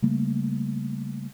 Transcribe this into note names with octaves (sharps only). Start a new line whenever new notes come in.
C#3 G3 A3 A#3